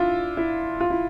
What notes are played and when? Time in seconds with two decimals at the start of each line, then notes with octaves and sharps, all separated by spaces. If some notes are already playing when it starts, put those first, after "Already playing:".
Already playing: D4 E4 F4
0.37 E4
0.80 F4
0.90 E4